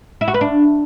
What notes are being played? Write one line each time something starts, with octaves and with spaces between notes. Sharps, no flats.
E4
F#4
B4
D4